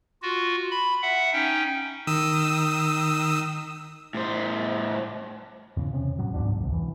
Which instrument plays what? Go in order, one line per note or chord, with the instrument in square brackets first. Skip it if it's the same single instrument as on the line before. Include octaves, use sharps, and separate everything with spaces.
[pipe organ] F4 F#4
B5
E5 F#5
C#4 D#4 G5
[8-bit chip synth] D#3 D#6 E6
[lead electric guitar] A2 C5
[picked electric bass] E2 C#3
C3 C#4
A1 F#3
D1 E2 G#2 D4
D#1 C2
E1 E3